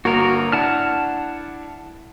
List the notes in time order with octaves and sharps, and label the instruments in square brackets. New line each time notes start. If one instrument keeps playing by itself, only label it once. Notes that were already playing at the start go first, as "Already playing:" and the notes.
[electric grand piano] G1 A#3 [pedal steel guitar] F#4 A#4
[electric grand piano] D4 E4 [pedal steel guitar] F#5 A5 F6